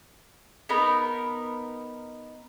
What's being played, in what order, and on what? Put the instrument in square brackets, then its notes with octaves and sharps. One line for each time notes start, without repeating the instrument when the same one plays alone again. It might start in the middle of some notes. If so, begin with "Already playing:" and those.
[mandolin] B3 D#4 A#4 B5